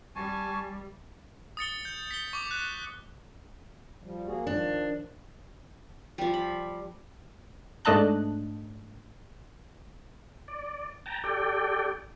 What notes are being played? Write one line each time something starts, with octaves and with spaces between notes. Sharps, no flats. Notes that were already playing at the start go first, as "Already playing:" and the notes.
G3 G#5 A5 C#6
D#6 A6 C#7 G7
G6
B6 G7
C#6 D6
F#6
F3 G3
A#3 F#4 G#4
D#3 F3 D4
F3 G3
B5
G#2 A3 D4 D#5 A5 F#6
D5
G5 A5 A#5
G4 A4 D5 G5